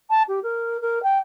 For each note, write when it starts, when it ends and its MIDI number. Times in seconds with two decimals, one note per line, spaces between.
0.10 0.23 81
0.28 0.39 67
0.43 0.80 70
0.81 1.02 70
1.03 1.18 79